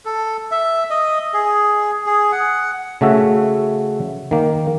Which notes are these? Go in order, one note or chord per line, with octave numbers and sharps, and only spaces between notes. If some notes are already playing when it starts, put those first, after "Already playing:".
A4
E5
D#5
G#4
G#4
F#5
C#3 A3 F#4 E5
D#3 A#3